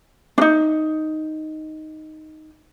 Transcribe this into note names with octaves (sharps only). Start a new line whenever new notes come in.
D4 D#4